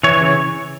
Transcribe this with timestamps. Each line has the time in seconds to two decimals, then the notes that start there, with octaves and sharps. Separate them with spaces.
0.04 E3 C#5
0.21 C#3